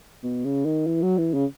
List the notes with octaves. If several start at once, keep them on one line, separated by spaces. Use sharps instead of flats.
B2
C#3
D#3
E3
F#3
E3
C#3